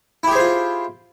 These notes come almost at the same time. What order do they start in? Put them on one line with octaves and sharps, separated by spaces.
E4 G4 G#4 C5 F4